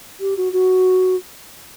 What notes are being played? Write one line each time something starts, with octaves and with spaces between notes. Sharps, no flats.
G4
F#4
F#4